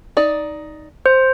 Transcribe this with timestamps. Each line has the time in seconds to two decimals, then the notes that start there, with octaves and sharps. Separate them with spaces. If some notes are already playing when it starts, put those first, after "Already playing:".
0.17 D#4 D5
1.06 C5